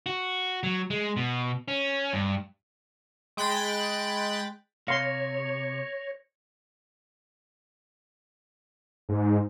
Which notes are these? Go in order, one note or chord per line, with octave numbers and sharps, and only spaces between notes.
F#4
F#3
G#3
B2
C#4
G2
G#3 G5 B5 F#6 A6
C3 C#5 F5 C6 A#6 C#7
G#2